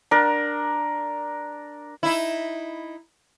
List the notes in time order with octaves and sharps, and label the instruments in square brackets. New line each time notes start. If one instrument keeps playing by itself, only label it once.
[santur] D4 A#4
[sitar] D#4 E4